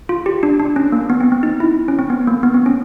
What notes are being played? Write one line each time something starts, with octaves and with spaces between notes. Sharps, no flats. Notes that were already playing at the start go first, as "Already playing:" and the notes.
F4
G4
D4
D4
C#4
A#3
B3
C4
C4
D#4
E4
C#4
C4
B3
A#3
B3
C4
C#4